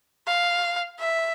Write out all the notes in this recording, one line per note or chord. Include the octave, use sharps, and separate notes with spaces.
F5
E5